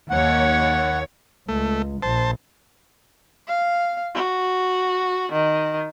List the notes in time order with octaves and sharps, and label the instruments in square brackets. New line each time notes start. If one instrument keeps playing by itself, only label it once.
[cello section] D#2 C#5 [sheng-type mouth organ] F#5
[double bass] C#2 [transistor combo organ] A3
[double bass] A#1 [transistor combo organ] C5 A5
[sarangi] F5
F#4
D#3